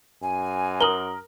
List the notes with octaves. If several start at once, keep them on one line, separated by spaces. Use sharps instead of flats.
F#2 G#5
A#4 D#6 F#7 G7